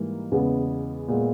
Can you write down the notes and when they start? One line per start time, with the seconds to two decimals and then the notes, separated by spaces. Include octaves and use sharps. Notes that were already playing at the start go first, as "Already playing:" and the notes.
Already playing: G#2 E3 G3 A#3
0.31 E2 C#3 G#3 B3
1.08 A#2 G#3 B3